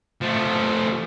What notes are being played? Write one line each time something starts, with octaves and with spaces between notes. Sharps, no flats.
F3 A3